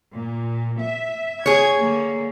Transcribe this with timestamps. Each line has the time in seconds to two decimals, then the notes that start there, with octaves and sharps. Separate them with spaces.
0.14 A#2
0.81 E5
1.46 G#4 C#5 G#6
1.77 D3 A#3